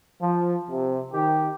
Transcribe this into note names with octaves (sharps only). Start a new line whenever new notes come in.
F3
C3
D#3 G4